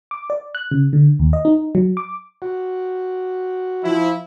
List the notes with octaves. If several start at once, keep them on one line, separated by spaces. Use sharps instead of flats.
D6
D5
F#6
C#3
D3
D#2
D#5
D#4
F#3
D6
F#4
F3 E4